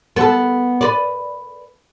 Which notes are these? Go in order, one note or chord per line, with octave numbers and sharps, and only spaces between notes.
B3 A4
B4 D5